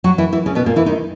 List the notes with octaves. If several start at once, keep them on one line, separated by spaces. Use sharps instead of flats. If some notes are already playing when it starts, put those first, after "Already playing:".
F#3 F#4
E3 E4
E3 E4
C#3 C#4
B2 B3
A#2 A#3
E3 E4
D#3 D#4